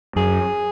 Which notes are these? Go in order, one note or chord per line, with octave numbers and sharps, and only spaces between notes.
F#2 G#4